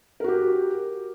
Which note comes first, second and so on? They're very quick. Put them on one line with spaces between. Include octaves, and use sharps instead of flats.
A#4 F#4 G4